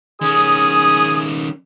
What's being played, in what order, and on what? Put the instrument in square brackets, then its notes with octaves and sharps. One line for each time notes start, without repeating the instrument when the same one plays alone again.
[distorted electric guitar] D#3 C#4 [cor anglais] G#4 [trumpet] D#6